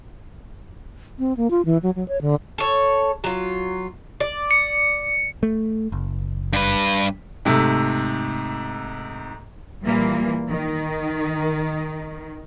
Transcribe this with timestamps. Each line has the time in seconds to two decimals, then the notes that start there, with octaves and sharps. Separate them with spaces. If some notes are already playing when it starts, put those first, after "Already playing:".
1.19 C4
1.37 A#3
1.51 F4
1.65 E3
1.83 F#3
1.96 F#3
2.08 C#5
2.21 D3
2.58 A4 C#5
3.24 F#3 F4
4.20 D5
4.51 C#7
5.43 A3
5.92 F#1
6.53 G2 B4
7.45 G#2 C3 A3
9.84 A#2 E3 G3 A#3
10.49 D#3